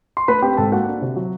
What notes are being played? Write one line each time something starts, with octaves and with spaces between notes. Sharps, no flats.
C6
A3 B4 B5
C4 G4 G5
G#2 A4 A5
A#3 F#4 F#5
D4
C3
F#3